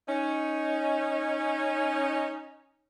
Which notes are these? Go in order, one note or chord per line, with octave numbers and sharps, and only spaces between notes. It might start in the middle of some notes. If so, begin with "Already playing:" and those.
C#4 D#4